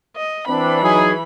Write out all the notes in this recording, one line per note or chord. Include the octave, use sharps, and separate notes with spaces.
D#5
E3 C4 D4 B5
F#3 D#4 G#4